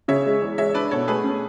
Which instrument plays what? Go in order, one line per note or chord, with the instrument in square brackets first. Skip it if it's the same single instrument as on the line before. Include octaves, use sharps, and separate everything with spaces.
[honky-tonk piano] C#3 [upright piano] C#5 E5
[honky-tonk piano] G#3
E2
[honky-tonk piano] G#3 [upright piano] C#5 E5
[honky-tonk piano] D4 [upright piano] B4 D5
[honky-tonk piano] B2 [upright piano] A4 C#5
[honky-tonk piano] A3 [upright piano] G#4 B4
[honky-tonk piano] C#4